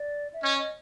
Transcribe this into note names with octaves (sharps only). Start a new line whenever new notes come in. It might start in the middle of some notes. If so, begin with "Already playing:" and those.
Already playing: D5
E5
C#4 D#5
D#5